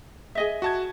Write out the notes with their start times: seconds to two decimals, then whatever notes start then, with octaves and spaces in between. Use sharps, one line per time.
0.35 G#4 D#5 E5
0.62 F#4 A5 G#6